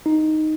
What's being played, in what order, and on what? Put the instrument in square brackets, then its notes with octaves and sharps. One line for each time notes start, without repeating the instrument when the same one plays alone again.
[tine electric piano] D#4